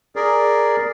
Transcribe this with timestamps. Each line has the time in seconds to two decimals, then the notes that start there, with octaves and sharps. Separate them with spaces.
0.16 G#4 A#4 D5